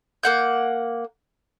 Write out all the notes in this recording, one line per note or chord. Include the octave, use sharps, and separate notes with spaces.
A#3 F#5 G6